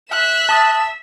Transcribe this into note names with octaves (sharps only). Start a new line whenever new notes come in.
E5 F#6 E7
A5 D#6 A6